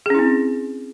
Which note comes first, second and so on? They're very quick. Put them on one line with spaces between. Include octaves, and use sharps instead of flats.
G#4 C#4 E4 C4